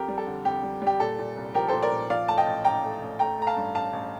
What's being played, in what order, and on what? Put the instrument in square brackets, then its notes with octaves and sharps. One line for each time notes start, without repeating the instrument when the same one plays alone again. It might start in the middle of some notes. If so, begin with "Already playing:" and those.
Already playing: [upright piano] F2 G4 A#4
G3
A4
D3
F2 G4
G3
G3 G4
A#2 A4
A#2
C2
F3 G4 A#4
A#2 A4 C5
A#4 D5
A#2
F3 D5 F5
A3 A5
D#5 G5
A1
A1 G5 A#5
A3
A1
A3 G5 A#5
A3 A#5
F5 A5
G2
A1 F5 A5
A1